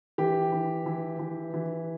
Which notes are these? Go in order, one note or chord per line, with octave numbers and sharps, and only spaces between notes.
E3 G4
E3
E3
E3
E3